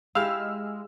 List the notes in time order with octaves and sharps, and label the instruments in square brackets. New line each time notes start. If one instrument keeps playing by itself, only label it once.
[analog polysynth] G#3 [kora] E4 G4 G#4 [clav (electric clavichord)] F5 [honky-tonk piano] E6 F6